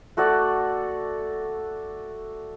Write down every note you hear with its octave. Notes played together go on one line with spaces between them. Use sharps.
A3 F#4 A4 D5